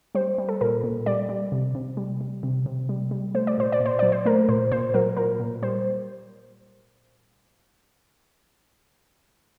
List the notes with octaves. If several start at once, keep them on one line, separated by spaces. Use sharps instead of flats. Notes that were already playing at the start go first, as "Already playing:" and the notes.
G3 C5
G3
A4
A#2 A#4
A#2
G3 D5
G3
C3
C3
G3
G3
C3
C3
G3
G3
A3 C5
D5
A#2 C5
D5
A#2
C5
F#3 D5
C5
A3 A#4
A#2 C5
A#2 C5
F#3 A#4
A#2 A#4
A#2
G3 C5